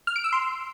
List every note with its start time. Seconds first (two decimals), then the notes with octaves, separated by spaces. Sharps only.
0.07 F6
0.16 D7
0.24 E6
0.33 C6